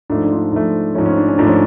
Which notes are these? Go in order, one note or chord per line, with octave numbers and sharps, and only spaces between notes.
G#2 F3 A3 D4
D4
F4
D4
G#2 F3 A3 D4
G#2 F3 A3 C#4
C#4
D4
C#4
G#2 F3 A3 D4
C#4